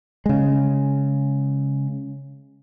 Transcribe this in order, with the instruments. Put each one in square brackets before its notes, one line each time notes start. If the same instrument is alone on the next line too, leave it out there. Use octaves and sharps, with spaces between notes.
[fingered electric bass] C#3 G#3